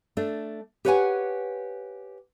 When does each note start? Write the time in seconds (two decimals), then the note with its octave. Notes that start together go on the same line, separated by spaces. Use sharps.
0.17 A3 D4
0.85 G4 B4 C#5 D5 F#5 G#5